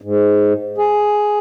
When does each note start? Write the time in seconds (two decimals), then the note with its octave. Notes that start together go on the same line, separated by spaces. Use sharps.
0.02 G#2
0.78 G#4